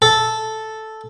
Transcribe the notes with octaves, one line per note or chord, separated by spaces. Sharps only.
A4